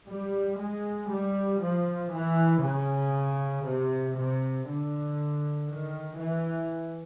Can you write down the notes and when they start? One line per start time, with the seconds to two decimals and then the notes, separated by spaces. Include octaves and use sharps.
0.09 G3
0.60 G#3
1.11 G3
1.62 F3
2.12 E3
2.63 C#3
3.65 C3
4.16 C3
4.67 D3
5.68 D#3
6.19 E3